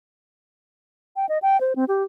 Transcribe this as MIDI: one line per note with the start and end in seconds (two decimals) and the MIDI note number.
1.16 1.26 79
1.29 1.38 75
1.42 1.60 79
1.61 1.73 72
1.76 1.85 60
1.88 2.03 67